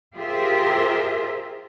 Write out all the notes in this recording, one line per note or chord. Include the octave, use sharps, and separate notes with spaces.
F4 G4 G#4 A#4 C5 E5